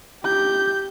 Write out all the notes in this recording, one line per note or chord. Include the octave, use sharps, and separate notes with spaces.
G4 G6